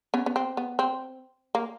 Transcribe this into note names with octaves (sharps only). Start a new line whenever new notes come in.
B3 C#4
B3
C4
B3
C4
A#3